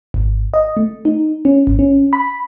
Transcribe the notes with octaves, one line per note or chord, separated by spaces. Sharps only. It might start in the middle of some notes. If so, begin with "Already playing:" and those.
G#1
D#5
A3
D#4
C#4
G#1
C#4
B5